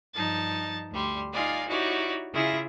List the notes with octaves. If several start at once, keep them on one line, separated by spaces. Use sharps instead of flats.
G2 F3 D#4 A5 A6
D2 G3 C6
D#4 F4 D5 D#5 F5 G#5
D#4 E4 F#4 G4 C#5 D5
C#3 E4 F4 G#4 E5 A#6